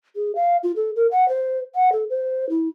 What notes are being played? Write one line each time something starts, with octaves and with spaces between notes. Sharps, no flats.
G#4
F5
F4
A4
A#4
F#5
C5
F#5
A4
C5
E4